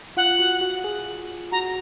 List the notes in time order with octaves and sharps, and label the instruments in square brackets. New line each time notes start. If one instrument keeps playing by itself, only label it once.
[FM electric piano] F4 [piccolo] F#5
[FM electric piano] F#4
F#4
G#4
[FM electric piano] F#4 [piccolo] A#5